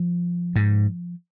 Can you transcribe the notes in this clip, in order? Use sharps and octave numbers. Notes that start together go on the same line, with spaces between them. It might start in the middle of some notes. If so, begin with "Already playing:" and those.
Already playing: F3
G#2